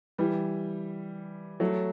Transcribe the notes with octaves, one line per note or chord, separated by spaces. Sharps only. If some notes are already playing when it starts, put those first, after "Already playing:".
E3 G3
F#3 A3